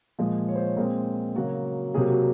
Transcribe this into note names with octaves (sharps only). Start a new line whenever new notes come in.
A#2 F3 G#3
C#5
C5
C#5
A#2 G#3 C4 A#4
C#3 F#3 A#3 F#4
C3 F#3 A#3 G#4
F#4